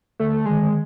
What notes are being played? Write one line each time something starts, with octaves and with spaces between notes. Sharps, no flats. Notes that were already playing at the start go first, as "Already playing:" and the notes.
D3 A3
D#3 G#3